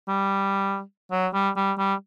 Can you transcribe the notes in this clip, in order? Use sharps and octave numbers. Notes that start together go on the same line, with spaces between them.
G3
F#3
G3
G3
G3